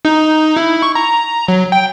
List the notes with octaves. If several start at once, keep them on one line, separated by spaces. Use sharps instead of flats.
D#4
E4
C#6
A#5
F#3
G5